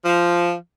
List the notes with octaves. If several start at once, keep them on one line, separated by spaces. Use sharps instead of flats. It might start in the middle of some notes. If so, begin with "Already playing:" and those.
F3